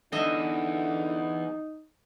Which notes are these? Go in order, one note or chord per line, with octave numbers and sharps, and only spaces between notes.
E2 D3 D#4 D#5 E5